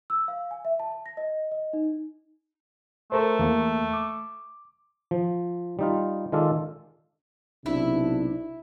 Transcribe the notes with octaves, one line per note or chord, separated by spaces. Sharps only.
E6
F5
G#5
E5
A5
A5
A#6
D#5
D#5
D#4
A3 A4 A#4 C5
E2 A#3
D6
F3
G3 D#4 F4
D#3 G#3 F4 A4 D5
B1 C3 D4 E4